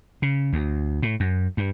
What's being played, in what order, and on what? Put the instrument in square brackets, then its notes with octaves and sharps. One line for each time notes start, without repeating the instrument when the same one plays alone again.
[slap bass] C#3
D2
A2
F#2
G2